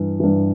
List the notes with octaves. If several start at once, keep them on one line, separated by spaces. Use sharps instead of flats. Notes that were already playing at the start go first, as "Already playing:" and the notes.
Already playing: G2 E3
G2 E3